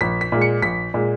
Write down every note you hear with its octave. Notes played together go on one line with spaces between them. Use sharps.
A#1 B6
B6
A#2 G#3
C#7
A#1 B6
A#2 G#3